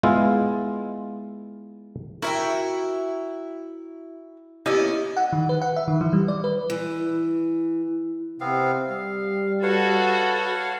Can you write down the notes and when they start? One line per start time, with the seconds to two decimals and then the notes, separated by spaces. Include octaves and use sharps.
0.03 G#3 B3 E4 F4
2.22 E4 F#4 A#4 E5 G5
4.66 A#3 B3 C#4 E4 G4 D5 D#5
5.17 F#5
5.33 D#3
5.49 B4
5.62 F#5
5.76 E5
5.88 D#3
6.01 E3
6.13 G3
6.28 D5
6.44 B4
6.70 E3
8.41 C3 B3 C4 F5
8.89 G3 F5
9.63 F#4 A4 B4 C#5 F5 F#5